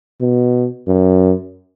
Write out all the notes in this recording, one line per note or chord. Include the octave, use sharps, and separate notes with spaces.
B2
F#2